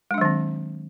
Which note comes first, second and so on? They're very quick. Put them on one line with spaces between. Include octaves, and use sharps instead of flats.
G#3 D4 F#3 D#3 C4